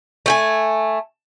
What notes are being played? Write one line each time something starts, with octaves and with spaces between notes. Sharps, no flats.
A3 G5 G#5